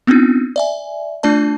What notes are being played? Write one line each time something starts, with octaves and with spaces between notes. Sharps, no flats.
B3 C4 D4 D#4 F4
D5 E5 G#5
A3 D4 F4 D5 A5